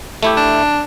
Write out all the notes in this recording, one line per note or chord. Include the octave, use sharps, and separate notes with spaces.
A3 E4 G4
D4